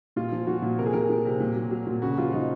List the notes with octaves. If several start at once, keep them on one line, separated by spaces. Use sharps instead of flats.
A#2 F4
F3
F3 F#4
A#2
C3 A#4
G#4
F3 A#4
F3
C3
A#2
F#3
F#3
A#2
C#3 F#4
F3 F4
F3 D#4